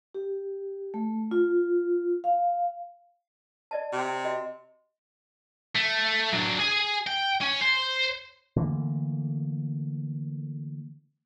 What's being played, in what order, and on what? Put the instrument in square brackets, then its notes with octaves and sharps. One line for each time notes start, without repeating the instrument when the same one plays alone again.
[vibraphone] G4
A3
F4
F5
[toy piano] D5 D#5 A5
[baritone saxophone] C3
[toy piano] F#4 D#5
[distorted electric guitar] A3
F#3 D4
G#4 G#5
G5
C#4
C5
[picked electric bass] D3 E3 A3 A#3